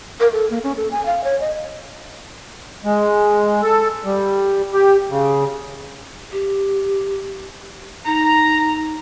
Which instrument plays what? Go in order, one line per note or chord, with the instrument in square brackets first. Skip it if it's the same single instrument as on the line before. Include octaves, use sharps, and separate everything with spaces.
[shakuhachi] A#4
A4
A#3
C#4
A4
G#5
F5
C#5
D#5
[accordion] G#3
A4
G3
G4
C#3
[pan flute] G4
[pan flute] D#4 [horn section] A#5